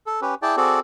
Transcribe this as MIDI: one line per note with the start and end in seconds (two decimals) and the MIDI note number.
0.06 0.20 69
0.22 0.35 61
0.22 0.35 67
0.22 0.35 71
0.42 0.56 64
0.42 0.56 68
0.42 0.56 74
0.42 0.56 79
0.42 0.56 81
0.57 0.80 60
0.57 0.80 66
0.57 0.80 68
0.57 0.80 69
0.57 0.80 74